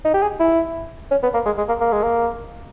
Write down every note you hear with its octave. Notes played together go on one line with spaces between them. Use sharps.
D#4
G4
G#4
E4
C#4
B3
A#3
G#3
G#3
A#3
A#3
G#3
A#3